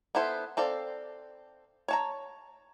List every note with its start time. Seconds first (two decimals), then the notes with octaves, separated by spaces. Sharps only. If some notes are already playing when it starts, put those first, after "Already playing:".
0.15 B3 E4 A4 C5
0.57 C4 A4 D5 F5
1.88 C#5 A5 A#5